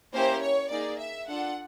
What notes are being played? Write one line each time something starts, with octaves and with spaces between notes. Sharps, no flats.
A#3 C#4 E4 G4 C5
C#5
A#3 D#4 G#4 D5
E5
D4 F4 A4 F#5